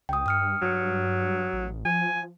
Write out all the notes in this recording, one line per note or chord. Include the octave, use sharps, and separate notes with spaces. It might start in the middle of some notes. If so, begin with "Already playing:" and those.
C#2 G5 D#6
G2 D#6 F6 C#7
G2 F#3
A1
F3 G#5